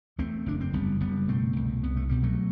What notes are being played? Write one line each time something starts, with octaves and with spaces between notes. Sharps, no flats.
E2 A3 C4
F#1 D4
C4
F#1 G3 B3
F#1 G3 B3
B2 A3 C4
C2
C2 B3
A3
B2 G3
F#3 A3